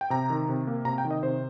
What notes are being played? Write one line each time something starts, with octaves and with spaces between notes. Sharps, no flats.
G5
C3 A#5
D#3
C3
A#3
C3 A#5
G5
D#3
D#5
C3 C5